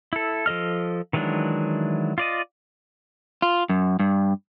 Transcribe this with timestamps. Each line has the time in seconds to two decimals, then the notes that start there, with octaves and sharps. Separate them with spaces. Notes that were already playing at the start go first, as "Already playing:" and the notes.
0.13 E4 A4
0.46 F3 A4 D#5 F6
1.13 D#3 E3 F#3 G#3 D4
2.18 F4 D5 D#5
3.42 F4
3.69 F#2
4.00 G2